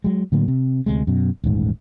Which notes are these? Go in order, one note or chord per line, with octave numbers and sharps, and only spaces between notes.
F#3 G#3
A2 D3 F#3 A#3
C3
D2 C3 G#3
F#2 B2
D#1 A1 G#2